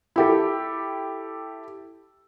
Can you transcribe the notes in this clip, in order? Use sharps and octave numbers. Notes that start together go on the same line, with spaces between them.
E4 G4 A4